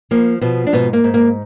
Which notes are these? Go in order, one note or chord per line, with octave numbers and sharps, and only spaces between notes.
F3 A#3
B2 F3 B3
D4
G#2 B2 B3
A#3
G#2
A#3